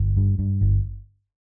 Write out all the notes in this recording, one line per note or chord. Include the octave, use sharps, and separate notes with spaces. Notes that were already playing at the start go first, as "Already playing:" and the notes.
Already playing: G1
G2
G2
G1